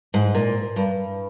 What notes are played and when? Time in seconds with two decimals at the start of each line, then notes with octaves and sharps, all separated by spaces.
0.14 G#2
0.35 A#2
0.76 G2